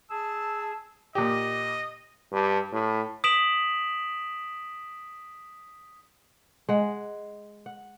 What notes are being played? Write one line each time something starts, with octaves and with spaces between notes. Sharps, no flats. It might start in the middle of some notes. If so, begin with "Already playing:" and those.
G#4 A5 E6
A#2 G4 D#5
G2
A2
D#6 B6 D7 E7 F#7
G#3 F#5
F#5